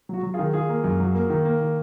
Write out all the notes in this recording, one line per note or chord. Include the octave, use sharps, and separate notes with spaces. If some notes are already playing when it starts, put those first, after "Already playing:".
F#3 F#4
F#3
F4 G#4
D#3
D#3 F4 G#4
A#3
F#2
F#3
A#3
D#3
A#3
D#3